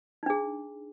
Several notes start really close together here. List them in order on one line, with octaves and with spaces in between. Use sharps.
D#4 D4 G#4